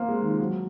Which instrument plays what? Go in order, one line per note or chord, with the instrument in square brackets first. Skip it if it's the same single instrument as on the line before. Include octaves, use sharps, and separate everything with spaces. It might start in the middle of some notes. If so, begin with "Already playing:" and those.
Already playing: [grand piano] A#3 C4 [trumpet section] F4 A#4 F5
[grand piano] G#3
D#3
F3
F#3